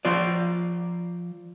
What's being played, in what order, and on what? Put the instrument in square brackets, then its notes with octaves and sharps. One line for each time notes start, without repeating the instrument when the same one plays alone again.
[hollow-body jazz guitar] F3 F4 D5